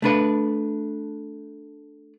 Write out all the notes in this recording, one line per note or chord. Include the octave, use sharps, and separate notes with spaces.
A3 D4 B4